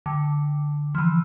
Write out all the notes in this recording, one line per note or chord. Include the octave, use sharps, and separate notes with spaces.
D3
F3
E3